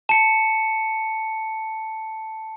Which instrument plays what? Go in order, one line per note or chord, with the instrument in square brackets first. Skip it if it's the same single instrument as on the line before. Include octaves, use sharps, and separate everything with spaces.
[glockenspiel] A5 C#7